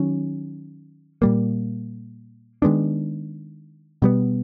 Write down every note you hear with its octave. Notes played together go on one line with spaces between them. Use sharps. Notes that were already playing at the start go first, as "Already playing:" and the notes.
Already playing: D#3 F#3 C#4
A#2 G3 A#3
D#3 G#3 B3 D4
B2 G3 B3